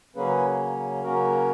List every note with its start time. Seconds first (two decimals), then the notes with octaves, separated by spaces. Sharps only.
0.16 C#3 F#3 A#3 C#4 G#4 B4
1.03 C#3 F#3 A#3 C#4 F#4 A#4